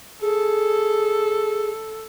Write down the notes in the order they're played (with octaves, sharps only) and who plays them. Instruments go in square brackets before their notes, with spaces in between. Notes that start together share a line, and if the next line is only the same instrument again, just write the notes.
[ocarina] G#4 [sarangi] A4